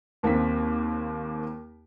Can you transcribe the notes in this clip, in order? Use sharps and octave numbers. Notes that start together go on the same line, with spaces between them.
D#2 A#3 C4 C#4 B6